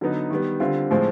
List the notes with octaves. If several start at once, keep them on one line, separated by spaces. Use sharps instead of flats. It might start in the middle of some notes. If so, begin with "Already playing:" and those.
D3 F#3 B3 D#4
D#3 G3 B3
D3 G3 C4 F4
A2 F3 G#3 C4